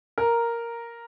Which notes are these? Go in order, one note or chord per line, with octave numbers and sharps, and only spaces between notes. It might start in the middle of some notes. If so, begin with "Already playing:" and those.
A#4 A#5